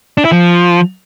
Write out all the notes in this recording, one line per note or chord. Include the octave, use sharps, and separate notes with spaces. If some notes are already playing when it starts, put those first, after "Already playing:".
D4
E4
F3